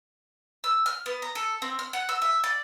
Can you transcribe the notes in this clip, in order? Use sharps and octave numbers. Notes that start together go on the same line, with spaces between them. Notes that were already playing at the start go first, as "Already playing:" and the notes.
E6
F6
B3
A#5
A4
C4
F6
F#5
E6
E5
D5